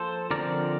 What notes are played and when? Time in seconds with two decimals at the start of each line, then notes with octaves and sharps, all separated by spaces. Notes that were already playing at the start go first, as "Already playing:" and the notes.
Already playing: F3 A#3 A4 C5
0.31 D3 F3 C4 A#4 D5